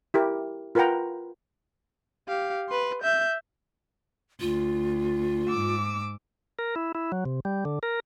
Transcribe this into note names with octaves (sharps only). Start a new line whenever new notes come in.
E4 G4 A#4
F4 A#4 B4 F#5 G5 A#5
G4 F5
B4 C6
E5 G6
D2 F4
G#2 D6 E6
A#4
E4
E4
F#3
C3
G3
D3
A#4